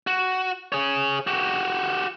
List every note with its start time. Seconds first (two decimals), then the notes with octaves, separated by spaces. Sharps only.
0.07 F#4
0.72 G#4 C#5
1.27 F#4 G4